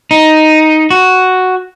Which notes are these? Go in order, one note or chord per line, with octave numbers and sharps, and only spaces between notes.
D#4
F#4